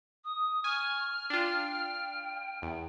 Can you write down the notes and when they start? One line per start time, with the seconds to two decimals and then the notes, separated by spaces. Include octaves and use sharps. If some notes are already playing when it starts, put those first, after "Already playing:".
0.24 D#6
0.64 G#5 C#6 F6
1.30 D4 F4 G5
2.62 E2